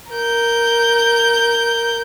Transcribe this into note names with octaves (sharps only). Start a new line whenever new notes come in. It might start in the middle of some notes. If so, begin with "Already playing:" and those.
A#4 G6